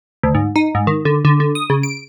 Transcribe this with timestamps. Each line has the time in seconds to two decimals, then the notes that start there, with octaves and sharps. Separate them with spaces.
0.23 D2
0.35 G#2
0.56 D#4
0.75 G#2
0.87 D#3
1.05 D3
1.25 D3
1.40 D3
1.55 D#6
1.70 C#3
1.83 D7